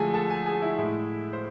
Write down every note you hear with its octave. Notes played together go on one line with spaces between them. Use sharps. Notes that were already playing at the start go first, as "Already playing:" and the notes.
Already playing: D3 F3 G#3 A3 G#4 A4 G#5
A4 A5
G#4 G#5
G#4 G#5
E4 E5
A2 G#3
C5